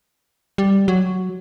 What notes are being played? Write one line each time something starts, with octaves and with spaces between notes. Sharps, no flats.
G3
F#3